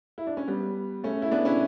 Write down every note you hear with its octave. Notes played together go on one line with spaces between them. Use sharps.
E4
D4
C#4
G3 B3
A3 C#4
E4
B3 D4
C#4 E4